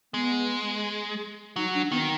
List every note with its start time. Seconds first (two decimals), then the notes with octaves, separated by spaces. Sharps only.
0.13 G#3 B3
1.56 F#3 D#4
1.75 D4
1.92 D#3 B3